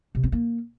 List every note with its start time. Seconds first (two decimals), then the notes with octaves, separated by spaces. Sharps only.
0.15 C3
0.24 C4
0.32 A#3